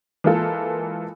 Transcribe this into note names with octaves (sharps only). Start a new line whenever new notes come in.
E3 G#3 A#3 F4 A4